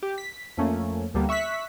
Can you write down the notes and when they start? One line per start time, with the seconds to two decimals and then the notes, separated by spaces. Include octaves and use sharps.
0.03 G4
0.18 B6
0.57 F2 F3 A3 A#3 C#4
1.14 D2 D3 G3 A#3 B3
1.29 E5 C#6 E6 F#6 B6